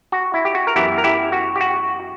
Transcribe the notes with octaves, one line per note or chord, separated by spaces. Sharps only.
F#4
E4
G4
F#4
A#4
F#2 E3 B3 E4 G4
A#4
E4 G4
F#4
G4
F#4